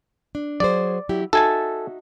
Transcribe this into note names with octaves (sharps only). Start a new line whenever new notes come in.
D4
F#3 G#4 C5 D5
F#3 E4 G4
D#4 F#4 A4 E5 G#5 A5